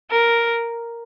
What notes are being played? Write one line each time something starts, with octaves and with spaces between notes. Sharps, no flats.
A#4